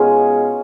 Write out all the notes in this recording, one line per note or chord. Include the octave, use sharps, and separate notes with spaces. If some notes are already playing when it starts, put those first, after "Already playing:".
Already playing: B2 G#3 C#4 D#4 F4 G#4